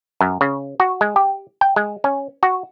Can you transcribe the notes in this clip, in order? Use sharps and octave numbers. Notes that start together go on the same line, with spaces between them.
F#2
C#3
F#4
G#3
G4
G5
G#3
C#4
F#4